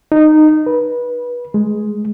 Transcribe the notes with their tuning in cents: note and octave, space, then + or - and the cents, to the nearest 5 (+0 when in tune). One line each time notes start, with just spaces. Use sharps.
D#4 -15
B4 -25
G#3 +5